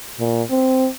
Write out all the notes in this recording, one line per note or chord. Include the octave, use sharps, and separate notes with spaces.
A#2
C4